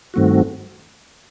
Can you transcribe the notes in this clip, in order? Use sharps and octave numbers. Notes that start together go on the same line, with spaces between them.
G2 D#3 A3 C4 F#4